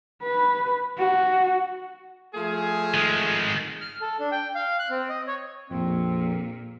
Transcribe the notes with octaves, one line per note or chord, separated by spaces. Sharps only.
B4
F#4
F3 A3 G#4
D#3 G#3
F6
A4
D4
G5
F5
F#6
C4
D#5
C#5
A#1 F2 A#2 C4